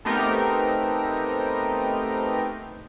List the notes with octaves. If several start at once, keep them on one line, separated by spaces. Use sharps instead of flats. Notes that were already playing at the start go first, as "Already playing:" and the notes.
A3 B3 C4 D#4 G4 A#4